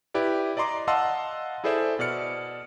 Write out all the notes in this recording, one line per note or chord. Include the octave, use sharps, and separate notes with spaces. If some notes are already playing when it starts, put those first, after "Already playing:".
E4 G4 B4 D5
D5 D#5 A#5 C6 D6
D#5 F5 F#5 A5 C6 E6
E4 G#4 A4 C5 D5 E5
B2 D5 F6 C#7